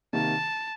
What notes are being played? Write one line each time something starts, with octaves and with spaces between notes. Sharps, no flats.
C3 D#3 A#3 A5